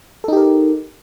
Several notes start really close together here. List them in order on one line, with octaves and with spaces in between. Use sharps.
A4 D#4 G4 A#4